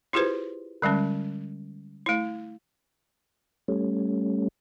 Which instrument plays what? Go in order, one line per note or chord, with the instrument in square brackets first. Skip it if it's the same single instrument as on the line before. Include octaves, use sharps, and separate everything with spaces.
[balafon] E4 F4 G4 G#4 B4 C5
D3 G3 G#3 C#4
A3 E4
[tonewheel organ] G3 A3 C#4